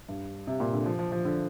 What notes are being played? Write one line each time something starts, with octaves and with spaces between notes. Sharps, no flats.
G2
C3
A#2
D3
F3
F3
F3
D3